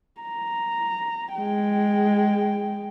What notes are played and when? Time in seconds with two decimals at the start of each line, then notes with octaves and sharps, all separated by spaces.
0.21 A#5
1.35 G#3 G5